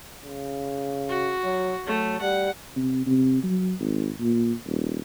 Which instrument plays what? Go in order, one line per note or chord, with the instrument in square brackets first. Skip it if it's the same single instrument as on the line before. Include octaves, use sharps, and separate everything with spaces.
[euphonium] C#3
[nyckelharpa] F#4
[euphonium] F#3
[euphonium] F#3 [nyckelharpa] A3
[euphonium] G3 [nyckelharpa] F#5
[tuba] C3
C3
F#3
G#1
A#2
D#1